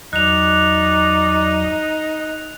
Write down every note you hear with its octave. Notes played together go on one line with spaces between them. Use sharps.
E2 F#3 D#4 D5 F#6 F7